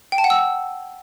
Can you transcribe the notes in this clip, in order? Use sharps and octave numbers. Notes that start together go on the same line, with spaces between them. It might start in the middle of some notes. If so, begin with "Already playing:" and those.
G5
A5
F#5
E6